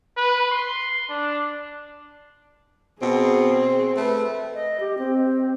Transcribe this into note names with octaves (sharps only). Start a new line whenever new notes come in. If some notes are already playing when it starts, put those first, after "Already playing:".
B4
C6
D4
B2 C4 G#4
A3 B4
D#5
G4
C4